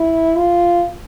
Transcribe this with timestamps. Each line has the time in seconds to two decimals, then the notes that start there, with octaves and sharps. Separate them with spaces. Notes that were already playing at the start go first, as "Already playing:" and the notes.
Already playing: E4
0.37 F4